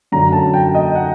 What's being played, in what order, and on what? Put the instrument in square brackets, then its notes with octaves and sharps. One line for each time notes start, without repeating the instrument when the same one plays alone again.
[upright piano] F#2 D3 F#3 A#5
A5
G5
D#5
F#5